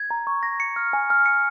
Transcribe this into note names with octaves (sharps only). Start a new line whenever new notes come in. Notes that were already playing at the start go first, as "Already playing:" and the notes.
Already playing: G#6
A#5
C#6
A#6
C#7
F6
G#5
F6
C#7